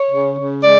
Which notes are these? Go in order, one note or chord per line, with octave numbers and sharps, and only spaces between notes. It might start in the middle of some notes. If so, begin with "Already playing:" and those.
Already playing: C#5
C#3
C#3
G#3 D5